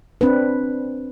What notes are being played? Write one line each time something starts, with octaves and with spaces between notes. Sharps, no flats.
C4 D4 B4